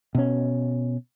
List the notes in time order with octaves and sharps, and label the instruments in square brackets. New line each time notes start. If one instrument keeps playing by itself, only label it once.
[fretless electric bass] B2 C#4